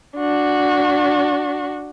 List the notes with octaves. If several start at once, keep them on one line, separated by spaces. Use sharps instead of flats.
D4 F#4